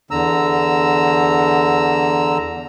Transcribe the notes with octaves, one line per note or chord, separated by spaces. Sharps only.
E2 D3 A#5 E6